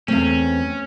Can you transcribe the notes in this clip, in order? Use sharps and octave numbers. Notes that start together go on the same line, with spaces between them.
E2 A3 C4 C#4